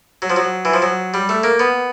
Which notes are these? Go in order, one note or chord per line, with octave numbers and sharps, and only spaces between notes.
F#3
F3
F#3
E3
F3
F#3
G3
A3
A#3
B3